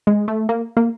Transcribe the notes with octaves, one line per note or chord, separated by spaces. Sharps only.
G#3
A3
A#3
A#3